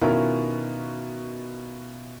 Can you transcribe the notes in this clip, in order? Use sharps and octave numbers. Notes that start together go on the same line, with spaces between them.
B2 D#3 C#4 E4 F4 A#4